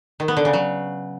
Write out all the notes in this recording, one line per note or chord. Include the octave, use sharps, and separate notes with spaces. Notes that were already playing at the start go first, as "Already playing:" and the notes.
D#3
B3
D3
C#3
F#3